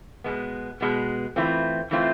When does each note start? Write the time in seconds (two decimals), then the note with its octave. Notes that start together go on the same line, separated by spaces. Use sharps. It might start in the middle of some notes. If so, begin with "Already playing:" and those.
0.24 B2 G#3 B3
0.81 B2 G#3 B3
1.36 E3 A3 C4 F4
1.91 E3 A3 C4 F4